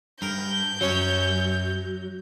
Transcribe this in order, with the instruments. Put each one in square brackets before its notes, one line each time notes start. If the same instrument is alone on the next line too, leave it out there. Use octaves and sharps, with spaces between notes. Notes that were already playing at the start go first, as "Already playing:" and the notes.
[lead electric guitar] G2 [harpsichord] A#4 [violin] G6
[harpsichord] F#2 C#4 C#5 [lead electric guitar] F#3